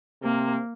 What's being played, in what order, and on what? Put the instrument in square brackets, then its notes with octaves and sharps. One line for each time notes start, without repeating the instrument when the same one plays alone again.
[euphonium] C3 [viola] A#3